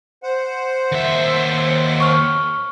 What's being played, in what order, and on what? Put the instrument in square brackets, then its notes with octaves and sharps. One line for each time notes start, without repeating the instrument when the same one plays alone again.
[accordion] C5 F#5
[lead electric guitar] D#2 E5
[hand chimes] C#6 F6